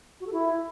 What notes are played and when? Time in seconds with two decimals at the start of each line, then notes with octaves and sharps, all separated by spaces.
0.20 F#4
0.27 A4
0.33 E4